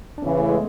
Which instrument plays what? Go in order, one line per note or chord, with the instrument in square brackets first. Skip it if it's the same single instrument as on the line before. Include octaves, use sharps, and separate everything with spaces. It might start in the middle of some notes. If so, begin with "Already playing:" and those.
[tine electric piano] D4
[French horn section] E2 C#3 E3 [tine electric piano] C#4
[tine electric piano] B3
A3
G#3